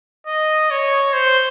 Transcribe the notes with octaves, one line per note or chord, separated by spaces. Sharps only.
D#5
C#5
C5